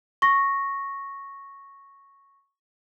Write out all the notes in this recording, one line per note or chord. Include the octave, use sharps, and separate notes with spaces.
C#6 A#6